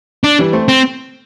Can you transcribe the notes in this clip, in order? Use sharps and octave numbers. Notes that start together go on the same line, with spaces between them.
D4
E3 G3
A3 C4
C4